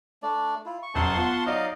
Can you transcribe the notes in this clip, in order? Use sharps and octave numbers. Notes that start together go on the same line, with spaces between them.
A3 D4 D5
E4 F4
C#6
F1 F#2 F#5 A5 C6
B3 F4
F#3 D#4 D5 D#5 F5